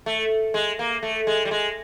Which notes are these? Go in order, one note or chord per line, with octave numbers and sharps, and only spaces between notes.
A3
G#3
A#3
A3
G#3
G3
G#3